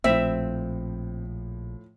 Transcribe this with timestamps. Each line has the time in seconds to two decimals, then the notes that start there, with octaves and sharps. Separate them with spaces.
0.04 A#1 A2 F3 C4 E5